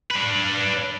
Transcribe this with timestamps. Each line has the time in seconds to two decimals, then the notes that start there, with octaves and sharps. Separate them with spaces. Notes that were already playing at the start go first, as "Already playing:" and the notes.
0.11 D4 B4